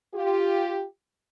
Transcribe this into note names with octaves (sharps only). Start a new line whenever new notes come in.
F4 G4